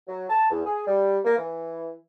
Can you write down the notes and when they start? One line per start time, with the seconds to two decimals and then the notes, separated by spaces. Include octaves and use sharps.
0.08 F#3
0.29 A5
0.50 E2
0.65 G#4
0.86 G3
1.24 A#3
1.38 E3